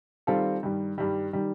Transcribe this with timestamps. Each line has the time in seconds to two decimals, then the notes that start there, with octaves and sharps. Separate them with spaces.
0.27 D#3 G3 C4 F4 A4
0.63 G2 D#3 G3
0.98 G2 D#3 G3
1.33 D#3 G3